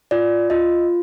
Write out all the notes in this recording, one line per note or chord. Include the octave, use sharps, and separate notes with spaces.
F4 D5
F4 D#5